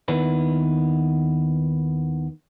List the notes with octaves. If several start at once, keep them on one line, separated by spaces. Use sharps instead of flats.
D#2 D#3 B3 E4 B4